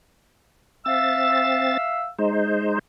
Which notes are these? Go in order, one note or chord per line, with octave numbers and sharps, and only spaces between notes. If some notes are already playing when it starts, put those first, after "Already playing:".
C4 E5 F5 E6 A6
G#3 D#4 C5